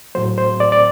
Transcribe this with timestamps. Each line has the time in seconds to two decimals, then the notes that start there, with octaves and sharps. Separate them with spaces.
0.15 A2 F#3 A3 C5
0.38 C5
0.60 D5
0.72 D5